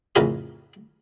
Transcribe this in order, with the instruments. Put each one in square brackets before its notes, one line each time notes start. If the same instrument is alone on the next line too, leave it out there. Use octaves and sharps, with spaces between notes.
[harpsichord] A1 F2 C#3 A#4 B4 C6